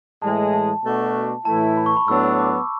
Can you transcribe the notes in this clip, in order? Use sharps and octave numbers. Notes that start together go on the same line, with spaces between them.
A2 E3 G#3 A5
A5
B2 A3 D4 F#4
A2 E3 A3 E4 A5
B5
C#6
B5
A2 F#3 B3 D4 E6
D6